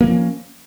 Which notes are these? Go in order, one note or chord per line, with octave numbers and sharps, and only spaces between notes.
E3 F3 A#3 C#4